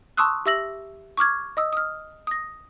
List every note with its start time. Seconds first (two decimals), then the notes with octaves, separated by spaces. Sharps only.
0.17 A5 C6 C#6 D#6 E6 F#6
0.46 G4 E5 E6 A#6 F#7
1.17 C#6 D6 F6 G#6
1.57 D#5 D#6 E6
1.73 D#6 F6
2.27 D#6 A#6